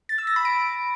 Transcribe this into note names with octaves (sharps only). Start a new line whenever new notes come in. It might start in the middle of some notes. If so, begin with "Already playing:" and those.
A6
E6
A#6
B5
D7